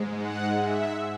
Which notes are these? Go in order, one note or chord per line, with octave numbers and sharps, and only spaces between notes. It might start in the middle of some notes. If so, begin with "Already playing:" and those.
Already playing: G#2 G#3
F#5
E5